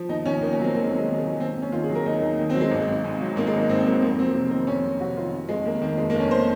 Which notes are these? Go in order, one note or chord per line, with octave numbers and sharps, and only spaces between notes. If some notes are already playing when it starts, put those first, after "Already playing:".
Already playing: F3
D#2 D#4
D#2 C#4
D#3 A#3
C#4
F#3 C4
D#2 A#3
G#3
D#2 A#3
G#3
D#3
G#3
F#3
D#2 C4
D#2
C#4
D#3 F4
G#4
F#3
A#4
D#2 D#4
D#2
D#3
C4
F#3
G#3
G#1
G#1
G#2
F#3
G#1 A#3
G#3
G#1
G#2 C4
C4
F#3 A#3
F2 A#3
F#3 C4
C3 A#3
D#3 C4
F2 C#4
F#3
C3 F#4
D#3 F4
F1
F1 G#3
D#2 A#3
D#3 A#3
F1 G#3
A#3
F1 C#4
C5